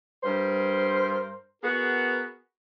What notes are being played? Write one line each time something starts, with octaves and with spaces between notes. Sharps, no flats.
G2 A#4 C5
B3 F#4 G#4 A#4